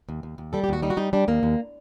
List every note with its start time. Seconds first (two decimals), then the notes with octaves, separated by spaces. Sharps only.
0.09 D#2
0.23 D#2
0.38 D#2
0.53 G3 A4
0.64 G4
0.69 D#2 F#4
0.82 G3 D#4
0.90 F#4
0.97 G3 D#4
1.13 G3 D4
1.28 D#2 A#3
1.43 D#2